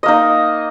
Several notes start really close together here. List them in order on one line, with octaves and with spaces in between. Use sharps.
D#5 A#3 D#4